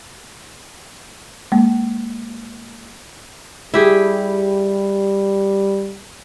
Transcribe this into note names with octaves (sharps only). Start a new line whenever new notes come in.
G#3 A#3
G3 E4 G4 G#4